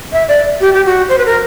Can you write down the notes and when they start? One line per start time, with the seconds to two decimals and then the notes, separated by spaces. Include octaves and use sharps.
0.12 E5
0.28 D5
0.60 G4
0.74 G4
0.85 F#4
1.09 C5
1.18 B4
1.26 A#4